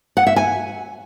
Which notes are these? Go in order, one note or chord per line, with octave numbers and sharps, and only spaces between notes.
F#5
E5
G#5